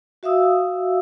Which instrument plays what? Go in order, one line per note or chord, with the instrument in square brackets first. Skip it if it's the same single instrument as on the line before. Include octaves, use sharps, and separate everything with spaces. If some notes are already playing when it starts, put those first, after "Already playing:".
[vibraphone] F#4 E5 F5 D#6 E6